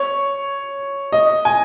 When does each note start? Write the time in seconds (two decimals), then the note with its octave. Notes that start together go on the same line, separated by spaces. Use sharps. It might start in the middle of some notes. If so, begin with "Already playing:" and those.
Already playing: C#5
1.12 D#5
1.45 G#5